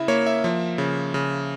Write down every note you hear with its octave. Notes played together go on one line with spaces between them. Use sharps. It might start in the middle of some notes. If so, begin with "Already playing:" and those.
Already playing: C#3 E4 E5
A#3 C#5
E5
F3
C#3
C#3